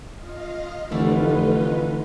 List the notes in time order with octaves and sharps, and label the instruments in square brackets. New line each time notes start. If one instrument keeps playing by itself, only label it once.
[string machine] F4 D#5 F5
[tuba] F1 [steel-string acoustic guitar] D3 E3 A3 [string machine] D#4 F4 B4